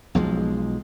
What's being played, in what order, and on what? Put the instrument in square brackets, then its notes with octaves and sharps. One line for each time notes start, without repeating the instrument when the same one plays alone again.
[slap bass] B1 F3 G#3